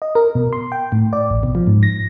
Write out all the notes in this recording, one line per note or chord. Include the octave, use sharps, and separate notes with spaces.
D#5
A#4
B2
C6
G5
A2
D5
A1
B2
F3
G#2
A#6